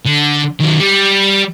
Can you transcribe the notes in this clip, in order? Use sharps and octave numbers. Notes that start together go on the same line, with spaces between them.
D3
D#3 F#3
G3